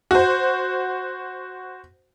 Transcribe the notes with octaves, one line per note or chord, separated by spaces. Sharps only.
F#4 C5